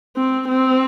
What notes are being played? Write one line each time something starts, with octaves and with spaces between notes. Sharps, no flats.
C4
C4